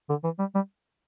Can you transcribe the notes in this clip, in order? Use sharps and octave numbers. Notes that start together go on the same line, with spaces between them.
D3
E3
G3
G3